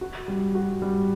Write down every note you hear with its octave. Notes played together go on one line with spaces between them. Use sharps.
F#4
G3
F#4
G3